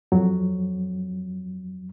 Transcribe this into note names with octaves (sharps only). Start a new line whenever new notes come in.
F2 F#3